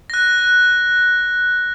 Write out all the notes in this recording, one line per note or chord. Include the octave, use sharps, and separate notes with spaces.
F#6 A#6